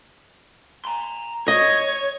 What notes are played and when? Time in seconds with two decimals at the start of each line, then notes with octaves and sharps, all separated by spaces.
0.85 A#5 C6
1.48 C#5 D#5 C#6 G#6